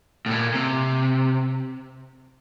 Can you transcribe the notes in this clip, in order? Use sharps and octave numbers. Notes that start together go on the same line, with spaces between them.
A2
A#2
C3